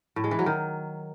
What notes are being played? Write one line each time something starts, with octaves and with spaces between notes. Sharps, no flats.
A2
G#3
E3
F#3
D#3